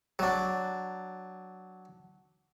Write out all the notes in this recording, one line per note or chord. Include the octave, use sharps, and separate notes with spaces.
F#3 D4